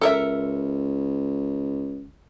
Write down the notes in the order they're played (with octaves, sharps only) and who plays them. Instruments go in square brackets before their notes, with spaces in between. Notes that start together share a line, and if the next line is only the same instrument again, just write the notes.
[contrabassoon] C#2 [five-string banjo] A4 A#4 E5